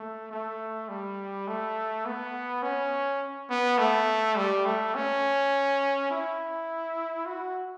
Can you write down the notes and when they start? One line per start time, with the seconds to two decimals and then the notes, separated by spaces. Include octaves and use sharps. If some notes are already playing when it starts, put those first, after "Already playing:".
Already playing: A3
0.31 A3
0.89 G3
1.48 A3
2.06 B3
2.63 C#4
3.50 B3
3.78 A3
4.36 G3
4.66 A3
4.95 C#4
6.11 E4
7.26 F#4